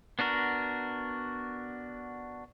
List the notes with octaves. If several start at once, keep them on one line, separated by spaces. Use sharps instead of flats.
B3 D4 F#4 A#4